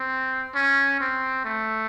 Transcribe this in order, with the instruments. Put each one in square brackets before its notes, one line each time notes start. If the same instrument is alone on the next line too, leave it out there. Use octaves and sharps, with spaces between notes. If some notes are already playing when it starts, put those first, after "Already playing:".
Already playing: [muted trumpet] C4
C#4
C4
A3